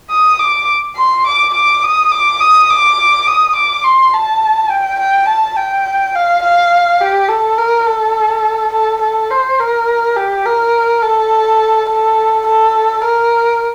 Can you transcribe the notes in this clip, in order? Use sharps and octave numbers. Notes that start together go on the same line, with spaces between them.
D#6
D6
C6
D6
D6
D#6
D6
D#6
D6
D#6
D6
C6
A5
G5
G5
A5
G5
F5
F5
G4
A4
A#4
A4
A4
A4
C5
A#4
G4
A#4
A4
A4
A4
A#4